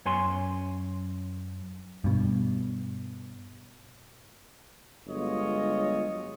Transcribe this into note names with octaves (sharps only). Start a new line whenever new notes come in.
F#2 C#5 G#5 C6
G2 B2
G1 F#3 G#3 F4 C#5 D#5